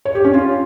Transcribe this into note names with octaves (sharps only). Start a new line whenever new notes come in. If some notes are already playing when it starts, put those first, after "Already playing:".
C#5
G4
C#4
F4